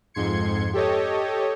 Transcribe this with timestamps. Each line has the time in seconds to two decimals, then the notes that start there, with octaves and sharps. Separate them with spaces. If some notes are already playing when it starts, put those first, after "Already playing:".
0.14 F2 G#2 C6 G#6 C#7
0.73 G4 A4 C#5 D#5